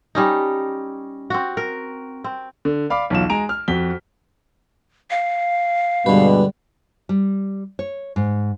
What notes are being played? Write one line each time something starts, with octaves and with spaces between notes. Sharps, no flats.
G3 C#4 D#4
C4 F#4
A#4
C4
D3
D5 F5 B5 D6
B1 E2 F#3 F4 E7
G#3 G#5 A#5 D7 F7
F6
F2 F#4 B6 G7
F5
G2 B2 D3 G3 G#3 B4
G3
C#5
G#2